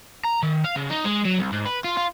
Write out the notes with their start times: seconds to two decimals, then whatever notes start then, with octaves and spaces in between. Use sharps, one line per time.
0.24 A#5
0.43 D#3
0.65 F5
0.76 C#3
0.91 D#4
1.06 G#3
1.25 F#3
1.39 C2
1.53 G#2
1.66 B4
1.84 F4
1.97 F4